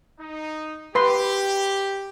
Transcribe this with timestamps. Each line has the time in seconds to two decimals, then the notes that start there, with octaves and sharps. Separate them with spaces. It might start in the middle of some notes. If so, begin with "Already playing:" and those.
0.20 D#4
0.95 G4 B4 C6